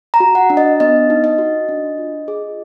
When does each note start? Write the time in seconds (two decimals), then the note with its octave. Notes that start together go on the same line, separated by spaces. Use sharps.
0.14 A#5
0.20 F#4
0.35 F#5
0.50 D4
0.57 D#5
0.80 B3 D#5
1.10 D#4
1.24 D#5
1.38 F#4
1.69 D4
1.98 F4
2.28 G#4